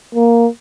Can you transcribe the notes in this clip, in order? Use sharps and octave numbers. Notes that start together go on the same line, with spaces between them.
A#3